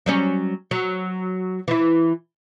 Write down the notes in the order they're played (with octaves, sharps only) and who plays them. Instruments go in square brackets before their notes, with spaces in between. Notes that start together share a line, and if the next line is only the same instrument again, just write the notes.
[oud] F#3 G3 C#4
F#3
E3 E4